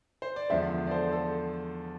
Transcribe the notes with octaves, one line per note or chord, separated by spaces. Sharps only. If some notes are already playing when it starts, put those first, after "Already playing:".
C5
D5
E2 D3 F3 G#3 C5 E5
D5
A4 C5
A4 C5